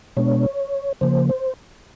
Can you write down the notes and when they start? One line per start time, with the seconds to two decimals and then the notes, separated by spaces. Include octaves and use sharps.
0.17 B2 G#3 B3 D4 C#5
1.01 C#3 F3 A#3 C5
1.29 C5